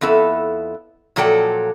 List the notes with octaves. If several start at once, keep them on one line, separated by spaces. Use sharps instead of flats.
F2 B3 E4 A4
A#2 F3 F#3 A4 D5 G5